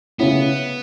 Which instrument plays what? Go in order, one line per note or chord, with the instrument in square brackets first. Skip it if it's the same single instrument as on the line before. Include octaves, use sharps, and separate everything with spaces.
[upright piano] C#3 A3 C#4 E4 [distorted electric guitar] B3